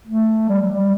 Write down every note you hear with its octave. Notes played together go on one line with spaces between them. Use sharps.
A3
G3
F#3
G3